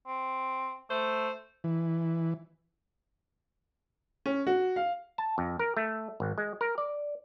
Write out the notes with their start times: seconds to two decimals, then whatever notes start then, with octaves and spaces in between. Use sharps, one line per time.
0.07 C4
0.90 A3 C5
1.64 E3
4.26 C#4
4.47 F#4
4.76 F5
5.18 A5
5.38 F2
5.59 A#4
5.77 A3
6.20 G#1
6.38 G#3
6.61 A#4
6.78 D5